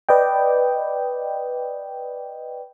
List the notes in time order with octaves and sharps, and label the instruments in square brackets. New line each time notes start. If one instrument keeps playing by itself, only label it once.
[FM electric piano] B4 D5 D#5 G5